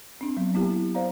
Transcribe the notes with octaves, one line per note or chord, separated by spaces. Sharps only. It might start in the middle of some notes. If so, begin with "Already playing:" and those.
C4 D4
F#3 B3
A#3 B3 E4 G4
C5 D5 F5 A#5